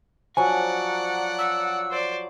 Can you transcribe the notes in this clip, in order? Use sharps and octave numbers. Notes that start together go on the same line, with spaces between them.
F3 F#3 D5 F#5 G#5
E6
C5 D5